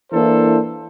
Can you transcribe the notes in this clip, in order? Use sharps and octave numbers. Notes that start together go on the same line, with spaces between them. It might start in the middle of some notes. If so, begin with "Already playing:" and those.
E3 A#3 D4 E4 A4 C5